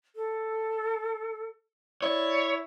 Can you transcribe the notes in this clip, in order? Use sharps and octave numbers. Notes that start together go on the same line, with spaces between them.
A4
E4 C#5 D5